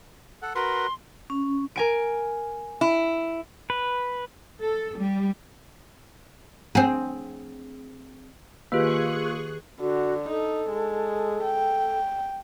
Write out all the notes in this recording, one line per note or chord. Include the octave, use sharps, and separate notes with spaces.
A4 F#5
F#4 A#4 B4 C6
C#4
A#4 G#5 D7
E4
B4
A4
G3
C4 G#4
D#3 A#3 F4 G4 G#4 B4 C#6 F#6
D3 F#4
D#4 A4
G#3
G5